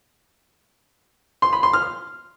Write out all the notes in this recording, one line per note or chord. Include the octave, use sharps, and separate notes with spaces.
C6
B5
C6
F6